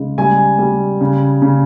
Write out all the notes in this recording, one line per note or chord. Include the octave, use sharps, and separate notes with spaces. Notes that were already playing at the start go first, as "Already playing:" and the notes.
Already playing: C#3 G#3
G3 G#5
G3
C#3
C#3